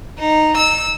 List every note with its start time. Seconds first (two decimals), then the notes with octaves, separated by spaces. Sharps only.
0.19 D#4
0.58 E6